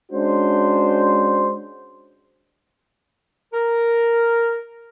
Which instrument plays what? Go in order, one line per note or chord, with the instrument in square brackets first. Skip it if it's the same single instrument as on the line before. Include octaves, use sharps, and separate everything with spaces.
[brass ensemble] G#3 C#4 D4 F#4 C5
[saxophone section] A#4